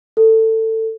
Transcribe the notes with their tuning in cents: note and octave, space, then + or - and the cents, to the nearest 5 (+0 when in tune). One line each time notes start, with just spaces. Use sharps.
A4 +20